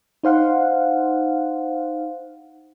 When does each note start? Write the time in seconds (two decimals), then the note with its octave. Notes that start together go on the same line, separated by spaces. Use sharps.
0.23 D#4 C5 F5 F#5